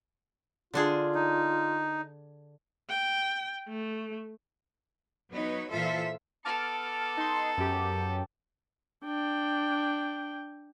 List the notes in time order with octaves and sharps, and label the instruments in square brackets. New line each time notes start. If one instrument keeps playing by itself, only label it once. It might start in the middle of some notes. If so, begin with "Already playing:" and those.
[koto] D3 D4 G#4 [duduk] F4
[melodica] D#4
[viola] G5
A3
[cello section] F#3 B3 D#4 B4 C#5
A#2 E3 F4 A4 C5 E5
[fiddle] B3 A4 [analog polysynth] A5 D6 F6
[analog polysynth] D#4 C6
F#2 G4
[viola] D4 G5